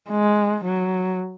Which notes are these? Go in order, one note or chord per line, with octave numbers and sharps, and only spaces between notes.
G#3
F#3